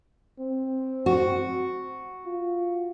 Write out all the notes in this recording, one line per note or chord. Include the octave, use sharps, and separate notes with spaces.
C4
F#4
F4